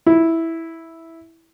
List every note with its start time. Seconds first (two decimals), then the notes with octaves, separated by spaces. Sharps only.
0.06 E4